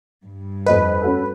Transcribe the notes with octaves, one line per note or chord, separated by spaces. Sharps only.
G2
F2 B4 D#5
C#4 F#4 A4